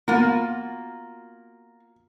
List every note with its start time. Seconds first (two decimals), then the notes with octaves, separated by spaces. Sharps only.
0.08 A#3 B3 F4 F#4